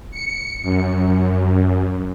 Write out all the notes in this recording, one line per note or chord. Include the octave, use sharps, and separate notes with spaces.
C#7
F#2